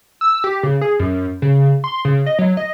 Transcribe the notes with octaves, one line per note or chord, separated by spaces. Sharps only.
E6
G4
C#3
G#4
F#2
C#3
C6
C#3
D#5
F#3
D#5